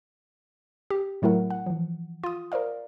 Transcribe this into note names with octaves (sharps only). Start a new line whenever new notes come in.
G4
A2 F#3 A3 E4 A#4 F#5
F#5
E3 F3
F4 D#6
A#4 C5 D5 F5